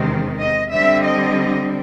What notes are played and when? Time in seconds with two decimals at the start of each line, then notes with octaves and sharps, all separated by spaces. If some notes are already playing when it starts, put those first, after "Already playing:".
Already playing: E2 C3 D#3 G#3 C4
0.39 D#5
0.71 D3 G3 C4 E5
1.05 D#5